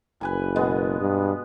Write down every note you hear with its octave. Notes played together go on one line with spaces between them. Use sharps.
F#1 B4 G#5 B5
B2 G#3 B3
G2